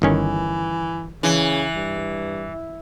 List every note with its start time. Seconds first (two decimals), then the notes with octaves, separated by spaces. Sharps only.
0.02 G1 D#3 E3 C#4
1.23 C#3 E3
1.75 G2